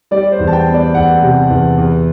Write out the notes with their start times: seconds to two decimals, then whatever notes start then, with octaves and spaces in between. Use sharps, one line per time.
0.11 G3 D5
0.23 D5
0.32 C5
0.39 E2
0.47 A5
0.53 G5
0.67 B3
0.74 D5
0.95 E2 F#5
1.22 C3
1.50 E2
1.78 E2